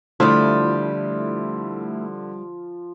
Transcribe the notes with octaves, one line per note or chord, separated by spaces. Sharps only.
D3 F3 G3 A3 E4 F4